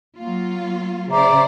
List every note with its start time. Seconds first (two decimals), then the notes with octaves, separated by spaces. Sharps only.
0.18 F#3 A#3 F4
1.11 C#3 C5 D5 E5 A#5 D6